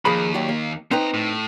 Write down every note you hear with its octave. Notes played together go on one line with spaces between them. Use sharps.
D#2 F3 G#4 B5
F#3 G3 F#4
A#3
B3 C4 D#4 B4 A#5
A2